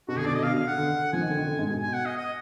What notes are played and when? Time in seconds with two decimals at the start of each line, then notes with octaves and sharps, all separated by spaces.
0.08 B2 F#4
0.16 D3 G#4
0.24 B2 D5
0.31 D3
0.35 D#5
0.39 B2
0.43 F5
0.47 D3
0.54 B2 F5
0.67 F#5
0.78 D3
1.13 F3 G#5
1.21 D#3
1.29 D3
1.37 D#3
1.47 D3
1.59 G#2
1.70 B2
1.83 G#5
1.93 F#5
2.05 D#5
2.17 D#5